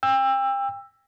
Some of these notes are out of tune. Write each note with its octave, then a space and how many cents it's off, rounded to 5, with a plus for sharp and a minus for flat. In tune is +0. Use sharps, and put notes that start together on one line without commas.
G5 +30 E6 +10